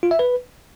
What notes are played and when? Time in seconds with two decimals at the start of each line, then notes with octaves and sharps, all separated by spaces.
0.03 F4
0.11 E5
0.19 B4